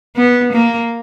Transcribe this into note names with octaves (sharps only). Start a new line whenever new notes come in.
B3
A#3